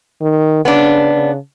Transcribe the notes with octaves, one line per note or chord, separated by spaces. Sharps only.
D#3
C#3 B3 D4
C#3